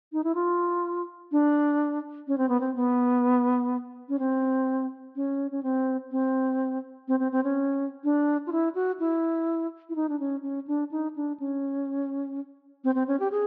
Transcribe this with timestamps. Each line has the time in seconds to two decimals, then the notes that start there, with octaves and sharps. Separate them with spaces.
0.13 D#4
0.24 E4
0.35 F4
1.32 D4
2.28 C#4
2.38 C4
2.49 B3
2.61 C4
2.76 B3
4.09 C#4
4.19 C4
5.16 C#4
5.51 C#4
5.63 C4
6.11 C4
7.08 C4
7.20 C4
7.32 C4
7.44 C#4
8.04 D4
8.47 F4
8.52 E4
8.75 F#4
9.00 E4
9.89 E4
9.96 D#4
10.09 D4
10.20 C#4
10.43 C#4
10.67 D4
10.91 D#4
11.16 D4
11.40 C#4
12.84 C4
12.95 C4
13.08 C#4
13.20 G4
13.32 G#4